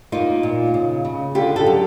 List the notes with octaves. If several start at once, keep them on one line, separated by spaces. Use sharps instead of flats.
A#3 D#4 F4
A#2
C#3
C#3
D3 F4 G4
G4 A4
F#3